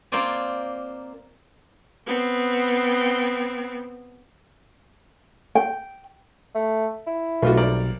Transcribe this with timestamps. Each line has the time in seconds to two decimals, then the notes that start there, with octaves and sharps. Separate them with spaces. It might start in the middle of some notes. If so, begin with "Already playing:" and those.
0.12 A#3 C4 F4 C5 D5 G#5
2.06 B3 C4
5.55 G5
6.55 A3
7.07 E4
7.42 B1 A3 F4 F#4
7.57 C2 A#4 D5